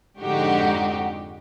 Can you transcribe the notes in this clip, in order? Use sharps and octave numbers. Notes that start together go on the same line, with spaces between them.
F2 G#2 D3 D#4 F#4 G4